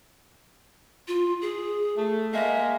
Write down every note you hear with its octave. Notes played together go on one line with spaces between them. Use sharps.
F4
G#4
A3
G#3 A#3 E5